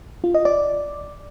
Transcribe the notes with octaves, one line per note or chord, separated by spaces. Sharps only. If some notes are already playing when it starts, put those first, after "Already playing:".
F4
D#5
D5